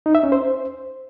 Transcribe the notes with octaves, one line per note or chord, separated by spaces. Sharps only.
D#4
E5
C#4
C5